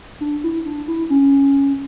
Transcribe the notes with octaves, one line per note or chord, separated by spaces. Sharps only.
D4
E4
D4
E4
C#4